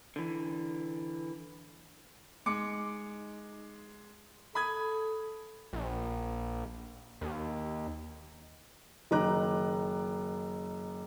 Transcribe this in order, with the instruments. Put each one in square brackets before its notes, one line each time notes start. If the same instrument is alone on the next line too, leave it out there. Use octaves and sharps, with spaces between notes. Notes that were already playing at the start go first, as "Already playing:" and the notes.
[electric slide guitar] D3 E3
[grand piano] G#3 D6 C#7 [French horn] D#4
[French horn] A4 [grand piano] B5 D#6 G#6
[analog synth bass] A#1
D#2
[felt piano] F#1 D#3 D#5 A#5 D6 F#6